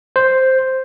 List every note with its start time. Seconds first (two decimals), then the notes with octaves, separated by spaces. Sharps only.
0.16 C5